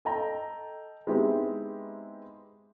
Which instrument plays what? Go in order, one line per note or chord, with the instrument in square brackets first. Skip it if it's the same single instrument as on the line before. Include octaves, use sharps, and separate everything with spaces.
[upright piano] A4 D#5 G5 A5 A#5
G#3 B3 C4 D#4 E4 G4